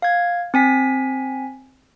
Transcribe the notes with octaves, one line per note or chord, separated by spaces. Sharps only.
F5 G#6
C4 G#5 B6